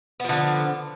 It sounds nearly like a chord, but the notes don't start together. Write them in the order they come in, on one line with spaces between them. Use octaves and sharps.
B3 F3 D3